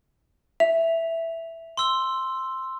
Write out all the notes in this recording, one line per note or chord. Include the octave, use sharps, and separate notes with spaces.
E5 F7
C6 E6 G7